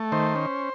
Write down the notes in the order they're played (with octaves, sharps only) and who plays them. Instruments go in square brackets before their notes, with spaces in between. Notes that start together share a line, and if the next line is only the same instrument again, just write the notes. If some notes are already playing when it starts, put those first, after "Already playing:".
Already playing: [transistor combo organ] A3
D#3 C5
C#4